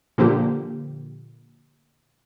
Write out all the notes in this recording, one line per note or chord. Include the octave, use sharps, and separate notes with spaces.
A#2 D3 F3 A#3 G4